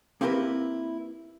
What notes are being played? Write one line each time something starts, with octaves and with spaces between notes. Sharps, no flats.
A#3 C4 E4 G4 A#4 B4